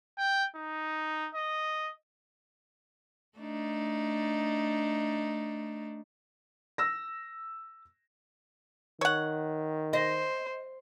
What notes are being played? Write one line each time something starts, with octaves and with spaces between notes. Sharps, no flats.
G5
D#4
D#5
A3 D4 D#4
E6 A#6
D#3 C#5 F#5
C5 D#5